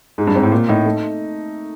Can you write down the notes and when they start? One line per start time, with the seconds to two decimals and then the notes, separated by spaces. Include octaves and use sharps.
0.18 G#2 G#3
0.27 G2
0.35 G#2 C4
0.43 A2
0.52 A#2 A#3
0.69 A2 D#4
0.85 A3